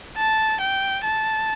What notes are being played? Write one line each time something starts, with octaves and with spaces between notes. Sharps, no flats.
A5
G5
A5